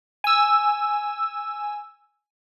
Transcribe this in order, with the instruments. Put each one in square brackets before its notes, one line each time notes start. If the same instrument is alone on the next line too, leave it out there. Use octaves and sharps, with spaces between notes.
[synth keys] G#5 E6